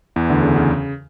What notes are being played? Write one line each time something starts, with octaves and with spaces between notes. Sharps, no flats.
E2 E3
D2 D3
C#3
C#3